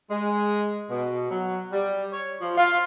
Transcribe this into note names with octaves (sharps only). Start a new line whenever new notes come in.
G#3
B2
F#3
G3
C#5
F3
F4